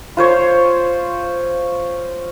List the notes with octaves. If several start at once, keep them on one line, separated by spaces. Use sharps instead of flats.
F4 C5 C#5